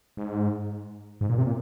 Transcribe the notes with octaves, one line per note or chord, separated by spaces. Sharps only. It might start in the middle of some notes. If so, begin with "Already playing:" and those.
G#2
G#2
A#2
C3
A#2